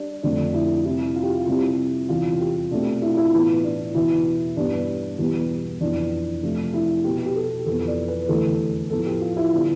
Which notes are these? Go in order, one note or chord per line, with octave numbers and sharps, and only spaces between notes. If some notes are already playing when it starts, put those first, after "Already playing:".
Already playing: G3 D4
F2 D3 A3 C4 D4
E4
C3 G3 C4 E4
F4
G4
F4
C3 G3 C4 E4
E2 C3 G3 F4
G4
B2 A3 C4 D4
E4
F4
E4
A2 E3 B3
D4
E2 B2 B3 E4
G2 E3 G3 B3 D4
E2 B2 G3 B3
F2 E3 B3 D4
C3 F3 A3 D4
E4
B2 B3 G4
G4
A4
F2 E3 B3 A4
D5
B4
E2 D3 A3 A4
A2 F3 B3 A4
G4
F4
E4
D3 G3 B3